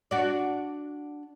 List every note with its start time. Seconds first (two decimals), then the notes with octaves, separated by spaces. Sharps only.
0.11 D4 F#4 D5